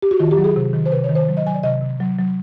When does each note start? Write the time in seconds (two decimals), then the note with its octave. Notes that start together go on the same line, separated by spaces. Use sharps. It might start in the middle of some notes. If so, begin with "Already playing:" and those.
0.02 G4
0.11 F#4
0.20 D#3 F4
0.31 G4
0.37 F#3
0.44 G#4
0.56 C3
0.73 D#3
0.86 C5
0.92 C3 B4
1.04 C#5
1.09 D#3
1.15 C5
1.29 F#3
1.37 D#5
1.46 F#3 G#5
1.54 D5
1.63 C3 D#5
1.82 C3
2.00 F#3
2.18 F#3